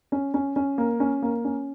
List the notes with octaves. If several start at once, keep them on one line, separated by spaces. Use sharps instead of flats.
C#4
C#4
C#4
A#3
C#4
A#3
C#4